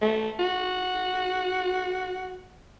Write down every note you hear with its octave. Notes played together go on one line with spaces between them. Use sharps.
A3
F#4